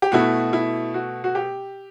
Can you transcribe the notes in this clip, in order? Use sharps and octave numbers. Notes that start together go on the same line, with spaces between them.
G4
B2 A3 E4 F#4
E4
F#4
F#4
G4